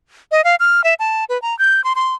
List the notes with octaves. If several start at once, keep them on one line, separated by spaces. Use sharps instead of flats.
D#5
F5
F6
E5
A5
B4
A#5
G6
C6
C6